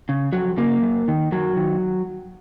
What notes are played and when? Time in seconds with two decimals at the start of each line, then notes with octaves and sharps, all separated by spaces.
0.09 C#3
0.33 F2 F#3
0.57 C#3 A#3
0.82 F#2
1.08 D#3
1.32 F#2 F#3
1.56 D#3